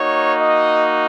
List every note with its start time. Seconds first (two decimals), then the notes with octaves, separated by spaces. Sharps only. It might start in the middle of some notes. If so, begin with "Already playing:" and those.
Already playing: A#3 D#4 F#4 C#5
0.39 D#5